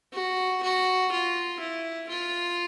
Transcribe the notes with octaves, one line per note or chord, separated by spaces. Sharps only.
F#4
F#4
F4
E4
F4